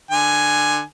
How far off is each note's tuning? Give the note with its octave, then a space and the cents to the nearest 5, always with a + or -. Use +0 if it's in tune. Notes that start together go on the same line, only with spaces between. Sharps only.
D3 +25 G#5 +5